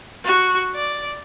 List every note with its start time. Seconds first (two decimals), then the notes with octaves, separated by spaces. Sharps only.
0.24 F#4
0.75 D5